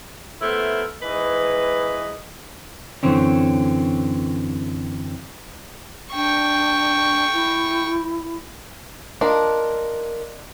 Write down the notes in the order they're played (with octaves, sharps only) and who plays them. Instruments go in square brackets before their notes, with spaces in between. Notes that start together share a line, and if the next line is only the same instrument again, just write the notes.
[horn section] A3 B3 E4 A#4 C5
G#2 E3 B4 D#5
[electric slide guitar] F#2 B2 D3 E3 C4 C#4
[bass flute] D4 [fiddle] G5 C#6
[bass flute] E4
[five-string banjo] D4 D#4 F4 [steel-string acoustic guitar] A#4